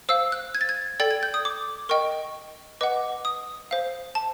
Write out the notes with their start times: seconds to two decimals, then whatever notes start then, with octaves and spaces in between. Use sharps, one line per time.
0.09 C5 F5 E6
0.32 F#6
0.55 G#6
0.61 A6
0.69 G#6
1.00 A4 D5 G5 A6
1.11 G#6
1.23 G6
1.34 D#6
1.45 D6
1.89 A#4 D#5 G5 C#6
2.81 B4 D#5 F#5 D6
3.25 D#6
3.71 C5 F5
4.15 A5